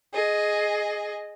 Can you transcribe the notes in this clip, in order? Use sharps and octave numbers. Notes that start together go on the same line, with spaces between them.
G#4 D#5